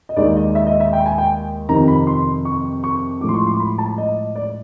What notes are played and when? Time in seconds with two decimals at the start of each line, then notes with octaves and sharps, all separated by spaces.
0.09 D#5
0.17 D#2 D#3 G#3 D5
0.36 D#5
0.55 E5
0.67 D#5
0.80 E5
0.93 G5
1.06 G#5
1.18 G5
1.69 F2 C3 D#3 A#5
1.88 B5
2.07 C6
2.45 C#6
2.84 C#6
3.21 A2 F3 G#3 D6
3.29 C6
3.34 C#6
3.47 C6
3.60 B5
3.78 A5
3.98 D#5
4.36 D5